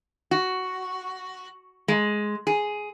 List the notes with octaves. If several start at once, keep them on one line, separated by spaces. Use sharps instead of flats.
F#4
G#3
G#4